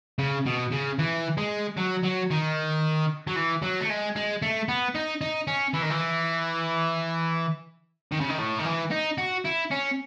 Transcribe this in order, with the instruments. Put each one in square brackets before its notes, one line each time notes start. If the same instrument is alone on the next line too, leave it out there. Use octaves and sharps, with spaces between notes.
[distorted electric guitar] C#3
B2
C#3
E3
G#3
F#3
F#3
D#3
F#3
E3
F#3
A3
G#3
G#3
A3
B3
D#4
D#4
C#4
E3
D#3
E3
D#3
C#3
D#3
A2
D#3
E3
D#4
F#4
E4
C#4